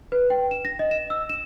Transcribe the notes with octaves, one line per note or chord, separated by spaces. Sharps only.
B4
G5
E7
A#6
D#5
E7
E6
E7